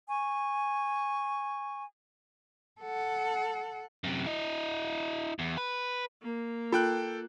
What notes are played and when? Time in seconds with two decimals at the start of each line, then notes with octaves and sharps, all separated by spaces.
0.09 G#5 C#6
2.81 A4 F#5
4.04 F#2 C3
4.26 E4 D#5
5.39 E2
5.57 B4
6.22 A#3
6.72 F4 A4 G5 F#6